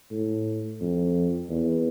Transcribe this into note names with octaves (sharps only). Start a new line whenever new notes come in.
A2
F2
E2